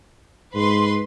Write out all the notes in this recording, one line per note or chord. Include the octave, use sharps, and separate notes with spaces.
G#2 B4 C6